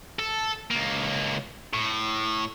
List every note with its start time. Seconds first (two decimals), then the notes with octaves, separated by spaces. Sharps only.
0.19 A4
0.71 C#2 A#3
1.74 A2